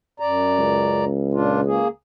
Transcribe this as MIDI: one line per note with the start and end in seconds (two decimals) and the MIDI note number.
0.20 1.05 42
0.20 1.05 74
0.20 1.05 82
0.58 1.83 37
1.33 1.61 46
1.33 1.61 62
1.33 1.61 65
1.66 1.88 58
1.66 1.88 68